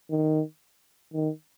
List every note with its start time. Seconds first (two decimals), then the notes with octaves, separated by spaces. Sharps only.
0.11 D#3
1.14 D#3